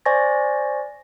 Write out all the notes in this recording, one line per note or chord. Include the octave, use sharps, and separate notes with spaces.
C5 D5 G#5 C#6 A6 A#6